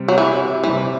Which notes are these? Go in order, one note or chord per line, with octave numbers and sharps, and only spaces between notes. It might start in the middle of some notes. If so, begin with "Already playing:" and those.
Already playing: C3 G3 C4
F#3
E3
C3 E3 G3 C4